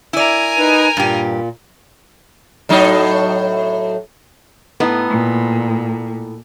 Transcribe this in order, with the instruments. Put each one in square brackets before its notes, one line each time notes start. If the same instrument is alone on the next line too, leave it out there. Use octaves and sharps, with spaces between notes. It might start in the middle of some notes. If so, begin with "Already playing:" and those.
[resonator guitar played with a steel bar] E4 D5 [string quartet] A#4 G#5
[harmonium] D#4 B4
[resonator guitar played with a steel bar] G2 G4 [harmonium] A#2
[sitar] A2 F#3 D#4
[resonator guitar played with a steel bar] A2 B3 D#4
[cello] A#2